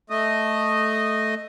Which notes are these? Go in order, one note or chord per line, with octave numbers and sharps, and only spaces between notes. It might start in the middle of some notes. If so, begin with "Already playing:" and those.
A3 D#5